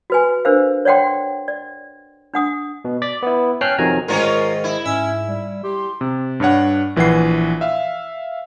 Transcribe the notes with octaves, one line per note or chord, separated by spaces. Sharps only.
F#4 B4 G#5
D4 A#4 C5 F5
C#5 D5 F#5 G5 C6
D5
D4 F#5 D#6
B2
D5 A6 B6
B3 E4
C#4 G5 A5 F6 F#6 C7
F2 C3 D#3 F#3 G#5 A#5
G#2 D#3 C#4 F4 A#4 D#5
E4
G#2 C#4 E5
G3
G4 C6
C3
G2 D4 C#5 F#5
A#1 E3 B4 F#5 C7
E5 F5